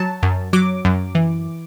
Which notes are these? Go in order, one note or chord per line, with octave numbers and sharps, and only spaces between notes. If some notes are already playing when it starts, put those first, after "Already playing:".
Already playing: F#3 A5
F#2
F#3 D6
F#2
E3